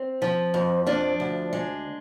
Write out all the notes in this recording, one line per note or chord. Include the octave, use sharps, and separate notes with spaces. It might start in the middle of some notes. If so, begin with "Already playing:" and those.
Already playing: C4
F3
F2
F3 D4
D2
G#3